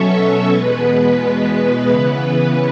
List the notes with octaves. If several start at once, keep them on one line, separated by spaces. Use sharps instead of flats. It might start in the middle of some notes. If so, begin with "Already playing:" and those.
Already playing: B2 F#3 C#4 A4 C#5 E5
E2 B2 G#3 B3 B4
C#3 E3 B3 B4